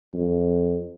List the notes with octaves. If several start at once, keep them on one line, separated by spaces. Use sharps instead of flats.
F2